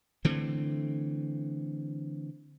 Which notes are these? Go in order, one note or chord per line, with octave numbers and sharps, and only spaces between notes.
D3 E3 A3 C4